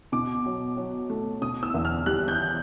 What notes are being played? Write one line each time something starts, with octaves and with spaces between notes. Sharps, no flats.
B2 D6
F#3
F#3
A3
B2 D#6
E6
E2
F6
G3 F#6
G6